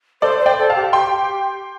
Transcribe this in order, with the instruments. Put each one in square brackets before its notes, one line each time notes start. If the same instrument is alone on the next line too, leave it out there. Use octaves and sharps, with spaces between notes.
[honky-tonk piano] A4 D5 [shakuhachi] C5
[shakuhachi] C5
[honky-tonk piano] D5 G5
[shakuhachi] A4
[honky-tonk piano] F5 A5
[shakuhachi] G4
[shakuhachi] G4 [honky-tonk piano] G5 C6